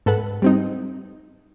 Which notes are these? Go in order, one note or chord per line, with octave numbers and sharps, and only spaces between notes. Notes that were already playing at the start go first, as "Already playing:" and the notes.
G#2 A4 B4 F#5
G3 C4 D#4